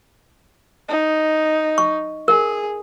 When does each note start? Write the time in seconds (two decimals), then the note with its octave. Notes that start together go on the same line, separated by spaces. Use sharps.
0.89 D#4
1.78 C#6
2.28 G#4 A#4